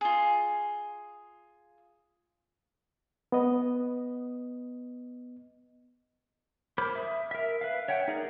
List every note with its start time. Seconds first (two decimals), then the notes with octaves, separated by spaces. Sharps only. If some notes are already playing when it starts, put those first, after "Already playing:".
0.01 F4 G#4
3.32 B3 D#5
6.78 A#4 C5 B5 D6
6.95 E5 D#6
7.31 A#4 E5
7.61 B4 E5 F5
7.88 C#5 E5 F#5 G5
8.08 D#4 G#4 A#4 D5